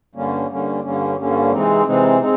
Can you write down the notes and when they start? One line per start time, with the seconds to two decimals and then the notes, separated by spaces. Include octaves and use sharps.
0.15 G2 D3 G3 A#3 C#4
0.49 G2 D3 G3 A#3 C#4
0.83 G2 D3 G3 A#3 C#4
1.19 G2 D3 G3 A#3 C#4
1.52 C3 E3 G#3 C4 D#4
1.86 C3 E3 G#3 C4 D#4
2.20 G#3 C4 D#4